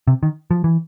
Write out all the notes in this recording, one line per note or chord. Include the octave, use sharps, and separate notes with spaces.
C3
D#3
F3
E3